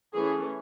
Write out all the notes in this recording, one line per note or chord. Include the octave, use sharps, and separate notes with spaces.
E3 A3 C#4 G#4